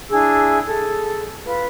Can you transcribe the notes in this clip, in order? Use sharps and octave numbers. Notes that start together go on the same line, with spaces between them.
D4 E4 G#4 E6
G#4 A4
F4 B4